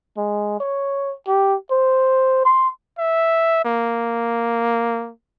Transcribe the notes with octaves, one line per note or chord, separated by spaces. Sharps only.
G#3
C#5
G4
C5
C6
E5
A#3